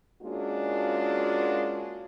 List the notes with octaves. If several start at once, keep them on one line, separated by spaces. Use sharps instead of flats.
G#3 A#3 C#4 D4 F4 F#4